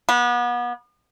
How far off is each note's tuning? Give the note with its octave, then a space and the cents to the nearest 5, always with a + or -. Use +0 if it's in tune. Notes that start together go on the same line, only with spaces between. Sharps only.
B3 -35